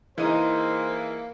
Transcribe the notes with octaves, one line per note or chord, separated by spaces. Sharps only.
E3 G#3 A#3 D#4 C5 D#7